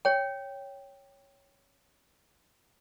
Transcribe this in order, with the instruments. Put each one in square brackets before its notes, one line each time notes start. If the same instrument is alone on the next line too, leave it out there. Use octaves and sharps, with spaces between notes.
[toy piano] C#5 G5